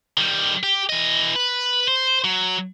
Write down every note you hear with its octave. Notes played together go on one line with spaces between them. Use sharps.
D#3 G3
G4
E3 D#5
B4
C5
F#3